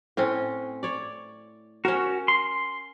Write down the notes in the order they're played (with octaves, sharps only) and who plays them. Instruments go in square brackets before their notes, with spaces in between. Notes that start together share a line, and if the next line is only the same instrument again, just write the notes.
[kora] A2 C4 C#4
C#5 D5
[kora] C#4 A#4 [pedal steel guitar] F#4
[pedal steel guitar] C6